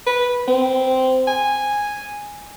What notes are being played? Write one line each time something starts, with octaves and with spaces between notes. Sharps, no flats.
B4
C4
G#5